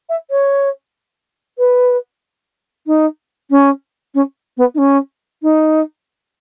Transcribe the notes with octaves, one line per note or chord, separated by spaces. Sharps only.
E5
C#5
B4
D#4
C#4
C#4
B3
D#4
C#4
D#4